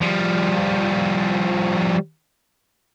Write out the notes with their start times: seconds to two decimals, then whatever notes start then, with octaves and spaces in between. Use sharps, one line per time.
0.01 F3 G3